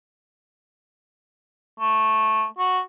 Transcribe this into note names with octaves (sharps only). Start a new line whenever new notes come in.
A3
F#4